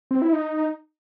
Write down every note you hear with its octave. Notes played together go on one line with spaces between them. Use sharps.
C4
E4
D#4